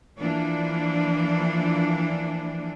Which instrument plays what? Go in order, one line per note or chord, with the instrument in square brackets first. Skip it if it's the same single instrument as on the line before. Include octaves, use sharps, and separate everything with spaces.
[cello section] E3 F3 A#3 D4